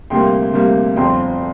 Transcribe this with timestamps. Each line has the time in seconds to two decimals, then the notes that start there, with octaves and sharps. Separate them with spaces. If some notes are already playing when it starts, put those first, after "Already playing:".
0.10 D2 C3 G3 A#3 G5 C6
0.54 D2 C3 G3 A#3
0.96 G1 F2 F3 C4 G5 C6